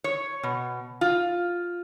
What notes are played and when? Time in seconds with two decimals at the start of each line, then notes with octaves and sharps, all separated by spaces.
0.04 C#5
0.43 B2
1.01 F4